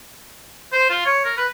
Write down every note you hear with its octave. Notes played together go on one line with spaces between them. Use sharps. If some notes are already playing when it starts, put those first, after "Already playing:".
C5
F4
C#5
A#4
B4